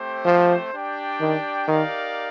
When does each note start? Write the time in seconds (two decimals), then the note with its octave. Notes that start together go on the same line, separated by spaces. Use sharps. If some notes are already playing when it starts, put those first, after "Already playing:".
Already playing: A3 C4 G4 C5 G5
0.25 F3
0.73 D4 G4 D5 G5
1.20 D#3
1.68 D#3 D#4 G4 A#4 D5 F5